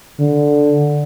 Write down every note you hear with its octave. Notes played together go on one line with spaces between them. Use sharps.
D3